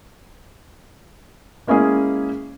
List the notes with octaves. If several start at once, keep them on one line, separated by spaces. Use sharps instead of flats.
G#3 A#3 C#4 E4 G#4